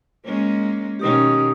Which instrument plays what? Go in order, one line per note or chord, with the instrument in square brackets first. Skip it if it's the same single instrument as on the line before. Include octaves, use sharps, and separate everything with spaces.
[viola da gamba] G#3 A#3 C#4
[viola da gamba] B2 D#3 C#4 [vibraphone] G4 D#6